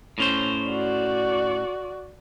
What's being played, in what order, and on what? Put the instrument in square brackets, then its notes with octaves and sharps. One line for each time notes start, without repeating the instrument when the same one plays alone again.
[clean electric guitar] A2 C#4 C5
[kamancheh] F#4 D5